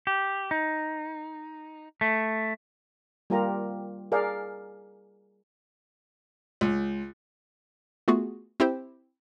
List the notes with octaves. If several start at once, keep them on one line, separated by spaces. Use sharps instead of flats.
G4
D#4
A3
G3 A#3 F4 G4 A#4 A#5
G#4 A#4 D5 F5
C#2
A3 B3 F4 F#4 G#4
C4 E4 G4 C5